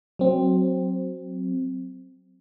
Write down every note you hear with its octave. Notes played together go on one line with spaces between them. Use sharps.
F#3 C4